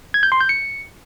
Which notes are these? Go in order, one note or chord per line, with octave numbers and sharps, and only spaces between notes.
G#6
G6
C6
G6
C#7